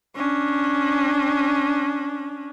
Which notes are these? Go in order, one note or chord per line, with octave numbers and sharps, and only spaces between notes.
C#4 D4